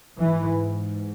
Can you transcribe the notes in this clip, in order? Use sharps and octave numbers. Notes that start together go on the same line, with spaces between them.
G#2 E3